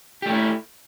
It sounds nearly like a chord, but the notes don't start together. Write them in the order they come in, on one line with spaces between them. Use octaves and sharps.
G4 A3 E4